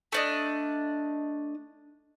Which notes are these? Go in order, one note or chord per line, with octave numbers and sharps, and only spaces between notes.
A3 D4 D#5